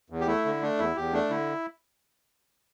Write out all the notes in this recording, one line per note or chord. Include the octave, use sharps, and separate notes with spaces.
E2
G4
A3 E4
D3
A3 D4
E2 E4
E2 G4
A3 D4
D3 E4